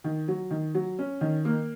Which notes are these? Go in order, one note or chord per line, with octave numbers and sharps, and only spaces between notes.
D#3
F#3
D#3
F#3
C#4
D#3
A#3